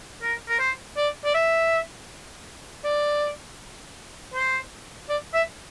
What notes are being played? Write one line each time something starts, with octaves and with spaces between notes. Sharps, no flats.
A#4
A#4
C5
D5
D5
E5
D5
C5
D5
E5